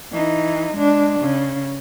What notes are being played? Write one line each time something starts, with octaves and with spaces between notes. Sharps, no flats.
E3 D#4
G#3 D4
C#3